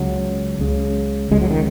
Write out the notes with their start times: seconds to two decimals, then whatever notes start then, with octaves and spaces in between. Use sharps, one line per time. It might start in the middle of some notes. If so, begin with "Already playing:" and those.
Already playing: C#2 C#3 F#3
0.60 C#2 C#3
1.31 C#2 C#3 G#3
1.41 F#3
1.51 D#3